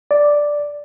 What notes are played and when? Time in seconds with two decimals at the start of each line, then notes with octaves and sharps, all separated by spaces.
0.11 D5